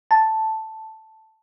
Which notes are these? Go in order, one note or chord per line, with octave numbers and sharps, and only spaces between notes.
A5